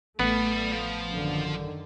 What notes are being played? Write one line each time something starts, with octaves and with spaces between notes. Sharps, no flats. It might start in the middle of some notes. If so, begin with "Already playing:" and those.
A1 A3 B3 D5 B5
F3
F#2 D3 D#3